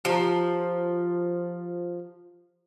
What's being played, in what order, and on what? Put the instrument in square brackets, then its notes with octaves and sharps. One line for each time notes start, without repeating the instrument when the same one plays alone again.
[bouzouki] F3 [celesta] G4 A5 A#5